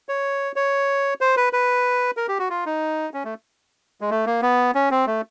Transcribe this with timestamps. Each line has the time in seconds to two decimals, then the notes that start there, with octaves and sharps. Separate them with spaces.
0.09 C#5
0.56 C#5
1.21 C5
1.37 B4
1.53 B4
2.17 A#4
2.28 G4
2.39 F#4
2.50 F4
2.66 D#4
3.14 C#4
3.25 A3
4.01 G#3
4.11 A3
4.26 A#3
4.42 B3
4.75 C#4
4.91 C4
5.07 A3